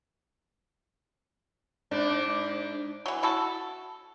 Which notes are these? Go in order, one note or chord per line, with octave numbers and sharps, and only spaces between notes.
G#2 D4
E3 F#3
E4 F#4 A4